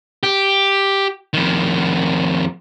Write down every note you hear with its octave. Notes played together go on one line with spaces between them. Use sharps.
G4
F2 D#3